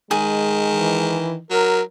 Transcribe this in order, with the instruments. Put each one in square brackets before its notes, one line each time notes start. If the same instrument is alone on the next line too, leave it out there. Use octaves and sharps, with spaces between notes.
[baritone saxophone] D#3 [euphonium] G#3 [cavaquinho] G#4
[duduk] E3
[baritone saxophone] F#3 [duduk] A#4